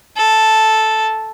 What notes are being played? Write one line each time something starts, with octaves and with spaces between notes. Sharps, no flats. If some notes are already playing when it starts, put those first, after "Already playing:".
A4